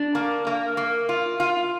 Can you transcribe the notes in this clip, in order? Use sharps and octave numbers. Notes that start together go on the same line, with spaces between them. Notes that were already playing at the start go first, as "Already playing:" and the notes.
Already playing: D4
A#3
A#3
A#3
F4
F4